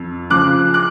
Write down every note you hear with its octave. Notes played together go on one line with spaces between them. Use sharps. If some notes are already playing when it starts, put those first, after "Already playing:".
Already playing: F2
C#3 F3 D6 F#6
D6 F#6